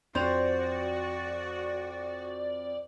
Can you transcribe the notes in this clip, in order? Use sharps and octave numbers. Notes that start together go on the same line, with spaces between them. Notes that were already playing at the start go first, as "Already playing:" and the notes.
F2 F#4 C5 D5 F7